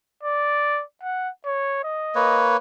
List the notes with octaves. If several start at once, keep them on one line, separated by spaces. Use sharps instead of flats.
D5
F#5
C#5
D#5
A#3 B4 C#5